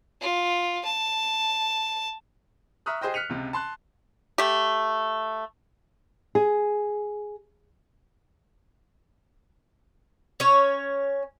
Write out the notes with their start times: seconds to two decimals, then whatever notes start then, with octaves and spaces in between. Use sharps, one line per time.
0.21 F4
0.84 A5
2.86 E5 A#5 C#6 D#6 F6 F#6
3.01 G4 G#4 C5 D#5 G5
3.14 F6 F#6 B6 C#7 D#7 F7
3.29 C#2 C3
3.53 A5 C6 F#6
4.38 A3 G4
6.35 G#4
10.40 C#4 C#5